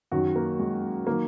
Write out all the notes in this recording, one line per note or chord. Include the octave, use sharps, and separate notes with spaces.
F#2 D#3 F#3 F#4
A#3
G#3
D#3 F#3 A#3